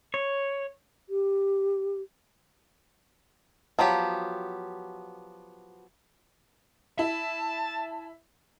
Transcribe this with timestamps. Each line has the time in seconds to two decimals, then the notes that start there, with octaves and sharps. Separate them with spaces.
0.14 C#5
1.09 G4
3.79 F3 F#3 B3 G4
6.99 E4 A5